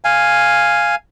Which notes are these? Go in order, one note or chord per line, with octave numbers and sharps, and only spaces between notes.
F5 G#5